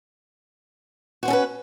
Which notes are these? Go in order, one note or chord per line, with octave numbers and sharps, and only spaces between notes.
C#4 F#4 A4 B4 C5